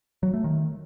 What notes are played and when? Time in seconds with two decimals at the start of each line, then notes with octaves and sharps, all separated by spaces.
0.23 F#3
0.34 A3
0.44 D#3